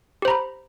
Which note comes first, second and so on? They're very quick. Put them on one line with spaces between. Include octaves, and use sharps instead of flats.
G4 C5 A#5 B5